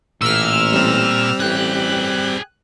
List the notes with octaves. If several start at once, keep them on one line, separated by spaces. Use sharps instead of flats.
A1 A#2 E6 F6
G3 C4
A1 G#4 G5 F#6